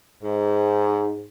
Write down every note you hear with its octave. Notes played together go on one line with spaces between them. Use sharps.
G#2